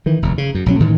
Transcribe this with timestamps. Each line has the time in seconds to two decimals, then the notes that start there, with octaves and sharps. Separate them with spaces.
0.06 D#3 E3
0.22 F1 D#2
0.38 C#3
0.55 F#2
0.66 A#1 F#3 C#4
0.80 A2 D#3 E3